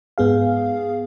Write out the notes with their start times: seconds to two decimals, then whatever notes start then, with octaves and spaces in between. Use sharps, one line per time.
0.18 G#2 B3 G#4 F5